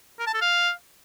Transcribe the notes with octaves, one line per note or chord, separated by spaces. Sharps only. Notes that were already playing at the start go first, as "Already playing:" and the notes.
A#4
A5
A4
F5